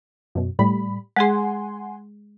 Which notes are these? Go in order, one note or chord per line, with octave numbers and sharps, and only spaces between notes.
F#2 B2
A2 G3 B5
G#3 G#4 F#5 G#5 C6